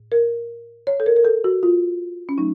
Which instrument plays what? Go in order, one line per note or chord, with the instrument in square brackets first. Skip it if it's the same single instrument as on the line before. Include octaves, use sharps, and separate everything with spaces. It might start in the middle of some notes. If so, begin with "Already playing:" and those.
Already playing: [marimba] A2
A#4
C#5
A4
A#4
A#4
A4
F#4
F4
C#4
F#3 A3 D#4